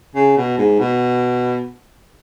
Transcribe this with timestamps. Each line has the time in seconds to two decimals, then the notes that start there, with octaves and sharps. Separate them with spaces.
0.15 C#3
0.37 B2
0.58 G#2
0.79 B2